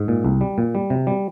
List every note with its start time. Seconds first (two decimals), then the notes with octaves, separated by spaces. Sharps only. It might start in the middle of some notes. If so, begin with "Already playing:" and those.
Already playing: G#2
0.08 A#2
0.24 C2
0.41 G3
0.58 A#2
0.75 G3
0.90 C3
1.07 G3